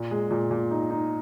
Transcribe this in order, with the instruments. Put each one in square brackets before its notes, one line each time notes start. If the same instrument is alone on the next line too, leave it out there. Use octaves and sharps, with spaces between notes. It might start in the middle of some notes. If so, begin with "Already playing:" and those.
Already playing: [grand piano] A#2
G#3
A#2
A#2
D#4
D#4